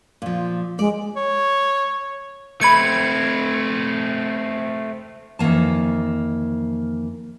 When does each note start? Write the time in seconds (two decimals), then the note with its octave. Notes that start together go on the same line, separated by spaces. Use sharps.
0.22 A#2 F3
0.79 G#3 D5
1.16 C#5
2.61 A3 C4 B5 G#6 C#7
5.39 F2 D#3 E3 A#3 A5